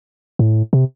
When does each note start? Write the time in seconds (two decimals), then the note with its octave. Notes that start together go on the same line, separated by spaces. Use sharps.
0.39 A2
0.73 C3